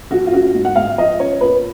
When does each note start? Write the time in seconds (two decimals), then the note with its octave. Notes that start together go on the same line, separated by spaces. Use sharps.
0.11 F3 F#4
0.27 F4
0.33 C#4 F#4
0.55 G#2
0.65 F#5
0.76 G#3 F5
0.97 F3 D#5
1.19 C#4 C#5
1.41 A#2 B4